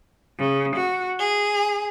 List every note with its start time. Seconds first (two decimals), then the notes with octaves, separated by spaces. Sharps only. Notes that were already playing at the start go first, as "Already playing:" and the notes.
0.37 C#3
0.75 F#4
1.19 G#4